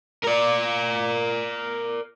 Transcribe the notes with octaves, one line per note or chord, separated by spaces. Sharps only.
A#4 D5